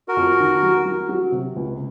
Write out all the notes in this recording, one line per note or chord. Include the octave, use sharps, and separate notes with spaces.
F#4 A#4
F2
D#3
F#3
F#3
F#3
C3
C#2